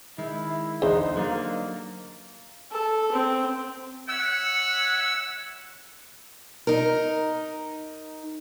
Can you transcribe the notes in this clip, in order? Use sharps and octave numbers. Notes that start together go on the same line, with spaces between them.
D#3 G#3 E4
E2 D3 D#4 C5
F#3 A#3 D4 D#4
A4
C4
C#5 E5 F#5 E6
D#4 A#4